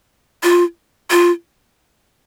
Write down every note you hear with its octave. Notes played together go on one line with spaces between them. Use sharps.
F4
F4